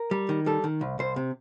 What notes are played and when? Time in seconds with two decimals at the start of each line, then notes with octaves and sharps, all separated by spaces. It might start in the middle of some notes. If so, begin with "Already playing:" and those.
Already playing: A#4
0.11 G3
0.29 D#3
0.46 G3 A4
0.64 D#3
0.81 C2
0.99 C2 C5
1.16 C3